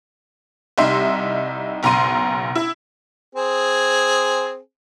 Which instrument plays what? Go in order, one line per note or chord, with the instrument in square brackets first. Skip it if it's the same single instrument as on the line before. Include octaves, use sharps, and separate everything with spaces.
[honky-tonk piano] C2 G3 D#4 E5 C6
F#1 B1 A#5 C6 D#7
E4
[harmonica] C4 G#4